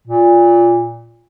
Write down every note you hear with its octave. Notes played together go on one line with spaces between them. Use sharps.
A#2